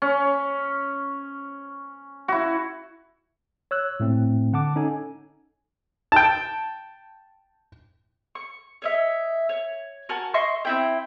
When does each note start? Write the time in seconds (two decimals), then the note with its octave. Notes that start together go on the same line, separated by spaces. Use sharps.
0.02 C#4
2.28 E4 F#4
3.71 C#5 E6 F#6
4.00 A2 A3 C4
4.53 D3 F#5 A5 D6
4.76 C#4 D#4 A4 G#5
6.12 G5 A5
8.35 C#6
8.82 C#5 D#5 E5
9.49 C#5
10.09 F#4 A#4 G#5 A5
10.34 D#5 E5 C6 C#6
10.65 C4 E4 G5